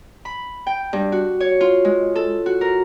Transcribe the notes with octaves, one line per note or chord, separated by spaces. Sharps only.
B5
G5
G2
F#4
C#5
F4
G#3
A4
F#4
A#4